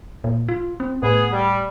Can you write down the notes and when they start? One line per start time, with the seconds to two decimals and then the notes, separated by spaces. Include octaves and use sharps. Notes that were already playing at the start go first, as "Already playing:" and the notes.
0.24 A#2
0.48 F4
0.80 C4
1.03 A2 B3 G#4
1.32 G3